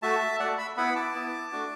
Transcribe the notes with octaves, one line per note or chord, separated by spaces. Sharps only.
A3 F#4 E5 A5
A3 F#4 D5 F#5
B5 E6
B3 E4 F#5 B5
A5 D6
B3 E4
A3 D4 F#4